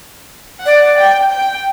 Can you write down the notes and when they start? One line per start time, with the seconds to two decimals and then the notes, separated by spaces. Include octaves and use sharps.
0.66 D5 F#5
0.99 G5
1.33 G5